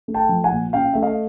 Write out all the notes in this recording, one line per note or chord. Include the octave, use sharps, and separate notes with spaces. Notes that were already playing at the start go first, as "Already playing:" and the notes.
A3
G5 A5
F3
F#5 G#5
A#2
C#4 F5 G5
A3 E5
D#5 F5